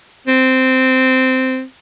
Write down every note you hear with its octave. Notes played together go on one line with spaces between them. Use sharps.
C4